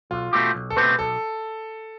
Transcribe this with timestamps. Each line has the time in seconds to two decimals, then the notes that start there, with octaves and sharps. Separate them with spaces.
0.11 B1 F4
0.33 B2 A3 C4 G4
0.55 B1
0.70 A4
0.76 B2 A3 C4 G4 B4
0.99 B1 A4